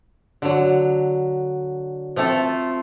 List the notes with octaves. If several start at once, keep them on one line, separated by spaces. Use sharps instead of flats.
D3 F#3
F3 A3 C4 F4 A4